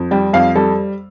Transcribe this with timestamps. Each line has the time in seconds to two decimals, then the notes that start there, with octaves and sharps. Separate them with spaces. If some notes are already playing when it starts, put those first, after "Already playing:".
Already playing: F2
0.11 G3 G5
0.33 F2 F5
0.56 G3 A4